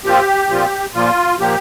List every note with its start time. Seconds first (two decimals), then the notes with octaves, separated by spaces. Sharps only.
0.04 A#2 F3 C4 F4 G4
0.50 A#2 F3 C4 F4
0.94 A#2 F3 A#3 F4
1.40 A#2 F3 A#3 G4